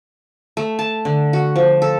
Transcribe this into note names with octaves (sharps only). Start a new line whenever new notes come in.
A3
A5
D3
F#4
F3
A4